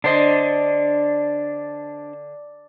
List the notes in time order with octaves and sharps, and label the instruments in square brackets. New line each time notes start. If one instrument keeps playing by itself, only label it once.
[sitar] D3 [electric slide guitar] D4 C5 D#5